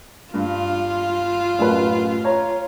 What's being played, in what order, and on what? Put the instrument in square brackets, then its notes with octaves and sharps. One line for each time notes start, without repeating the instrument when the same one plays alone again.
[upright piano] G2 [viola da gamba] F4
[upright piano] A1 F#2 B4
C#5 A#5